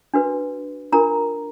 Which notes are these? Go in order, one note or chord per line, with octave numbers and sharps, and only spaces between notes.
D4 F#4 B4
D4 F4 A#4 A#5